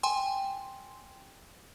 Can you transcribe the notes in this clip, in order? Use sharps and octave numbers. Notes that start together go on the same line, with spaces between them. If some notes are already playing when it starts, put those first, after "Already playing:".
G5 G#5 C6